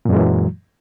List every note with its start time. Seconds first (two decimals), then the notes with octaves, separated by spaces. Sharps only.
0.05 A#2
0.09 F#2
0.12 G#3
0.16 E3
0.20 F#3